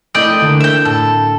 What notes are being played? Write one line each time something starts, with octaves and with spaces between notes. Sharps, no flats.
A3 C4 E4 D5 D#5 G5
D3 A#3 F#4
E5 G5
A2 A4